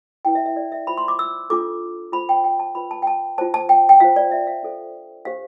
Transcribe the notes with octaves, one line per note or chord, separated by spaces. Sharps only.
E4 B4 G5
E5
E5
D5
E5
F4 C5 B5
C6
D6
E6
D4 F4 A4 D6
F4 C5 B5
G5
G5
A5
F4 B4 B5
A5
G5
A5
F4 C5 A5
A5
G5
G5
F4 C5 F5
D5
E5
F5
D4 A4 C5
D4 G4 C5 F5